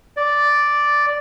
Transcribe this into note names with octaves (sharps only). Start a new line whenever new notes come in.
D5